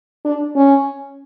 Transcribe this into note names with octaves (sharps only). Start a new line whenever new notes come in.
D4
C#4